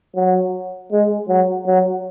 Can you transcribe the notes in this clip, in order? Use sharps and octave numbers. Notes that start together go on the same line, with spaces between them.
F#3
G#3
F#3
F#3